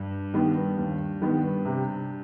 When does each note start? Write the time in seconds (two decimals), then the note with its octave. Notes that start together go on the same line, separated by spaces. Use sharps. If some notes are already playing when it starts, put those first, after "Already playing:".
Already playing: G2
0.34 D#3 G3 B3
0.78 D#2
1.22 D#3 G3 B3
1.65 C3